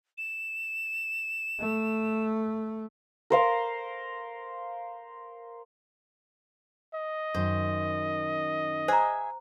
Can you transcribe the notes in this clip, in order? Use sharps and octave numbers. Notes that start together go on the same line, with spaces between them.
E7
A3
A#4 C5 F5
D#5
F#2 D#3 C5
G#4 C5 E5 G#5 A#5